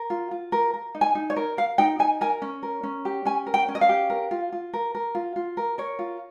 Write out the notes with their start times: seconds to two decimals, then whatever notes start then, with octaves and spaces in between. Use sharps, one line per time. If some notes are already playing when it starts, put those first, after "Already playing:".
Already playing: A#4
0.10 F4
0.31 F4
0.52 A#4
0.74 A#4
0.95 D#4
1.01 G#5
1.15 D#4
1.30 C#5
1.36 A#4
1.57 A#4 F5
1.78 D#4 G5
1.99 D#4 G#5
2.21 A#4 G#5
2.42 C#4
2.63 A#4
2.83 C#4
3.05 G4
3.25 C#4 G#5
3.47 A#4
3.54 G5
3.68 C#4
3.75 D#5
3.81 F5
3.89 G4
4.10 A#4
4.31 F4
4.52 F4
4.73 A#4
4.95 A#4
5.15 F4
5.36 F4
5.57 A#4
5.78 A#4 C#5
5.99 F4